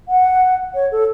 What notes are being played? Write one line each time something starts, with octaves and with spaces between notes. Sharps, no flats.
F#5
C#5
A4